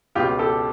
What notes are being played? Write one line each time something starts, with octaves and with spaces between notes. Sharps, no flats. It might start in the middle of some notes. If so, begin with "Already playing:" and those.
C#2 B2 F4 G4
G4 A4